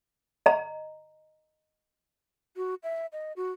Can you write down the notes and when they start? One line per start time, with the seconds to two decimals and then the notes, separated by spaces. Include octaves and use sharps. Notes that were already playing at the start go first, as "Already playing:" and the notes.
0.46 D#5 A#5
2.56 F#4
2.83 E5
3.12 D#5
3.36 F#4